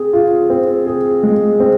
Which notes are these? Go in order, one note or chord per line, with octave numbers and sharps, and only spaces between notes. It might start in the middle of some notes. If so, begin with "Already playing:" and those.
Already playing: C4 G#4
F4
C4
G#4
G#3
C4